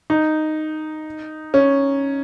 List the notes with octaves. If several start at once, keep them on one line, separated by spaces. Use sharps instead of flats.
D#4
C#4